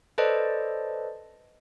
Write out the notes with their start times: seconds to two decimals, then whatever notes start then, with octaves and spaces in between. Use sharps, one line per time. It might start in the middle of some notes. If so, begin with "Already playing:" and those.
0.18 A4 B4 C5 D5 D#5 A5